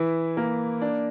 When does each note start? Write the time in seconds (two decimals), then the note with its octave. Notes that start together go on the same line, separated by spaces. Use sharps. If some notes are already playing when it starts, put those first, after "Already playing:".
Already playing: E3 E4
0.37 A#3
0.82 D4